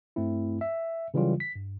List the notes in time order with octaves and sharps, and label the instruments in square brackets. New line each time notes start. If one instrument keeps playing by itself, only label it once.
[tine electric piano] G2 A3 C4 E4
E5
C#3 E3 F#3 G3 F4
B6
G2